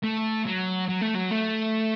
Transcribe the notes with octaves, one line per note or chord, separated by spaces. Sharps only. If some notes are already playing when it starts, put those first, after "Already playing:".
A3
F#3
F#3
A3
F#3
A3